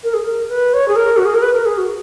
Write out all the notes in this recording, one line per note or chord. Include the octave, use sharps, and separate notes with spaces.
A#4
G#4
A#4
B4
C#5
G#4
A#4
F#4
G#4
A#4
B4
A#4
G#4
F#4